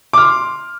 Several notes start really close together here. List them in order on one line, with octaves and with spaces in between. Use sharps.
D6 F6 C6